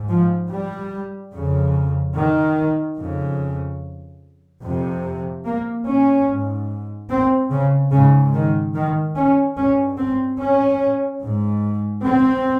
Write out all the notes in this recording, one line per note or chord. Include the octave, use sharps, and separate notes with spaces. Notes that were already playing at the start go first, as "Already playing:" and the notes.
Already playing: G#2
F3
G3
F2 C#3
D#3
F2 C#3
F2 C3
A#3
C#4
G#2
C4
C#3
G#2 C#3
D#3
D#3
C#4
G2 C#4
C4
C#4
G#2
C4